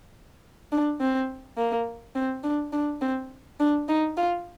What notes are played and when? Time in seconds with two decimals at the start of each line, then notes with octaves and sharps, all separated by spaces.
0.72 D4
1.01 C4
1.57 A#3
2.16 C4
2.44 D4
2.73 D4
3.02 C4
3.60 D4
3.89 D#4
4.17 F4